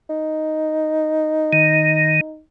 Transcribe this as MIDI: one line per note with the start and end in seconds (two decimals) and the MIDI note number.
0.09 2.40 63
1.53 2.21 51